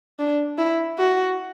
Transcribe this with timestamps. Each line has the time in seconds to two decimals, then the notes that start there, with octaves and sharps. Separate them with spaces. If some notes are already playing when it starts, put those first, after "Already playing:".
0.19 D4
0.58 E4
0.98 F#4